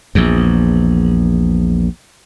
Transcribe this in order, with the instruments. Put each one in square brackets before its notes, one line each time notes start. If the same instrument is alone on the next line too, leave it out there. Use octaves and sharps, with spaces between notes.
[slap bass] A#1 E2